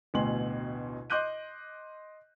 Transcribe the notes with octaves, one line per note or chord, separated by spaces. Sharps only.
A1 D2 B2 G#5 C6 F#7
D#5 C6 D6 F#6 G6 D#7